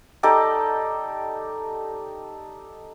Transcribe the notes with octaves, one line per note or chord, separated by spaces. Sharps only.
D#4 G4 A4 D5